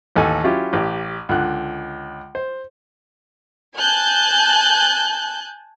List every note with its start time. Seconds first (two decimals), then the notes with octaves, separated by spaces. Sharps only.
0.16 A1 D#2 A4 G#5
0.44 F#3 C#4 E4 F4 G4
0.73 A1 G4
1.29 C#2 D3 F#6
2.35 C5
3.77 G#5 A5 F#6 G6